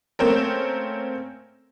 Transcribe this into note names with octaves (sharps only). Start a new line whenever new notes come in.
A3 A#3 C4 C#4 A#4